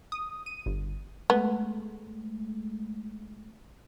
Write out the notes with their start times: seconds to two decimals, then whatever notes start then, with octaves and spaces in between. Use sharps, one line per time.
0.12 D#6
0.46 D#7
0.66 G1
1.30 G#3 A3 B3